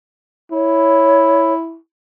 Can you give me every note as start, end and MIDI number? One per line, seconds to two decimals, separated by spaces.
0.52 1.77 64
0.52 1.52 73